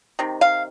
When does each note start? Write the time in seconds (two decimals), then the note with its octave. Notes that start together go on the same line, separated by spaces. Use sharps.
0.19 C3 D#3
0.41 F5